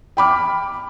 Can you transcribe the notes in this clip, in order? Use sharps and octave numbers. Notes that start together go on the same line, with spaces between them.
G5 B5 D6 F6